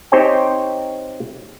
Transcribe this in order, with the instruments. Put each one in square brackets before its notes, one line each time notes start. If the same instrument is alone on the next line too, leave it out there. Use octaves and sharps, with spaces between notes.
[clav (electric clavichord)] C4 D#4 G4 C5 C#5 G5